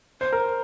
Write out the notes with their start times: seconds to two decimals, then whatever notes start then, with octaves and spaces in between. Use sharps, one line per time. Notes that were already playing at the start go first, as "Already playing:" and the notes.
0.21 C5
0.32 A#4